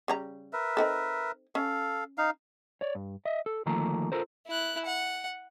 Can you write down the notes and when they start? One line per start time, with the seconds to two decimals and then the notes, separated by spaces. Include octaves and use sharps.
0.08 C#3 G3 A#5
0.53 A#4 B4 E5
0.77 C4 D#4 A4
1.55 C#4 A4 F5
2.18 D#4 F5
2.81 C#5 D5
2.95 G2
3.25 D#5 E5
3.46 A4
3.66 D2 D#3 F3 A3 A#3 A#5
4.12 F4 A4 A#4 C5
4.47 E4 F#6
4.85 F#5